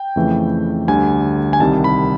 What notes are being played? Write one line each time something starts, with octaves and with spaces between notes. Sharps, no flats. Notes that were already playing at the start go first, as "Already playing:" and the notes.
Already playing: G5
F2 C#3 E3 A3
D2 D3 G3 G#5
G#5
C2 C3 D#3 G3 A5
B5